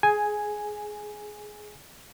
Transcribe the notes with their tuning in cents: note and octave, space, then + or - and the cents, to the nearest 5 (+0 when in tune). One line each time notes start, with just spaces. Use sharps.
G#4 +15 G#5 +0